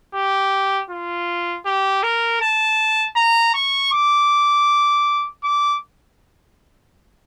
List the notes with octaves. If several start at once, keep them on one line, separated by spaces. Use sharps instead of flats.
G4
F4
G4
A#4
A5
A#5
C#6
D6
D6